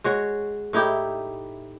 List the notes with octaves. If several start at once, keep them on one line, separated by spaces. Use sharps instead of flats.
G#3 F#4 C#5
A2 D#4 E4 G4